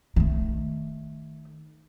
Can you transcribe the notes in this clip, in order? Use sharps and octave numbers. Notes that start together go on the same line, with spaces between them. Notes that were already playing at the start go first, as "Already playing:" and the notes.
D#3 A3